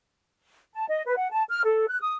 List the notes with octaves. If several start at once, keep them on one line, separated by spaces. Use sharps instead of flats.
A5
D#5
B4
F#5
A5
F6
A4
F#6
D#6